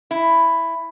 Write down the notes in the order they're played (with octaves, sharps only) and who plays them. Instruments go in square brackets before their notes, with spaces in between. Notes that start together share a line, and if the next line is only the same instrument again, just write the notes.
[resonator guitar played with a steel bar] E4